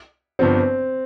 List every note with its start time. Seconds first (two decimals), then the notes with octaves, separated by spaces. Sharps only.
0.39 G1 G2 F3 B3 C4